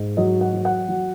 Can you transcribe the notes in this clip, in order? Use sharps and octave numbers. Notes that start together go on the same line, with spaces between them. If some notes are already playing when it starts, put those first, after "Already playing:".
Already playing: G#2
F#3 D#5
F#5
F#3
F#5
F#3